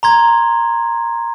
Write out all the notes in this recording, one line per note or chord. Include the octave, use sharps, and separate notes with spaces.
A#5 C6 G#6